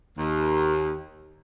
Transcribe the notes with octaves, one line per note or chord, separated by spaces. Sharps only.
D#2